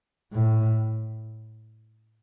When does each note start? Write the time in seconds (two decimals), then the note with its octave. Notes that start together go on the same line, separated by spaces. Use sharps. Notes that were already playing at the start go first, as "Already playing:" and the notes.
0.33 A2